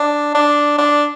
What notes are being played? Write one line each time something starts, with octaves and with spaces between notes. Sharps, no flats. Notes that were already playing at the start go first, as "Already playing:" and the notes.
Already playing: D4
D4
D4